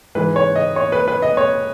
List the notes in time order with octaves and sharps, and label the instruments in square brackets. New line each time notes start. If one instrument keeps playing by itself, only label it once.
[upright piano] G#2 E3 G#3 B4
C#5
D#5
C#5
B4
B4
D#5
C#5